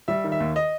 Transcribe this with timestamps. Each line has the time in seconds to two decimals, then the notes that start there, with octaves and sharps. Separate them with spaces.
0.08 G3 E5
0.24 D#3
0.32 E5
0.40 D#2
0.56 D#5